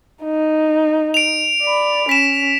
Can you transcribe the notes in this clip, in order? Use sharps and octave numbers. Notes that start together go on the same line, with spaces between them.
D#4
D7 F7
D5 B5
C#4 B6 E7